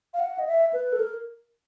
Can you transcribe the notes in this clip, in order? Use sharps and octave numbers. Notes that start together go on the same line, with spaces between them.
F5
F#5
D#5
E5
B4
A4
A#4